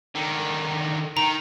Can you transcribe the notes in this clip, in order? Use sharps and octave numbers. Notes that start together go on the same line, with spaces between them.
D3 D#3
D#3 A#5